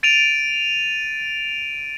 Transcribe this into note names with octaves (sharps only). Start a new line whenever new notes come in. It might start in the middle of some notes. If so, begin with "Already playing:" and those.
A6 D7 D#7 F7